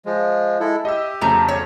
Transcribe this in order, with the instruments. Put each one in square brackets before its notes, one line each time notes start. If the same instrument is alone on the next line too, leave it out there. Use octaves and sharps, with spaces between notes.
[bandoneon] F3 G#3
G#3 E4 A4
[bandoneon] G4 [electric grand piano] D#5 E5 E6
[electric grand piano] F2 C#3 [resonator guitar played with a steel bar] A3 A#5
[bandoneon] D2 [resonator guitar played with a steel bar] C#5